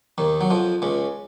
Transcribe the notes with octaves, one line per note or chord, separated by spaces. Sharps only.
D#2 D#3
F#3
F2 F3
C#2 C#3